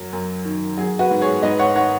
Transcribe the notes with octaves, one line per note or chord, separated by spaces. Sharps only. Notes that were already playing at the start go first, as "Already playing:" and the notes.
Already playing: F#2 F#3
F#2
D#3
F#3 G#4
F#4 B4
G#2
G#4 C#5
G#2 B4 D#5
C#5 F#5
D#3 C#5 F#5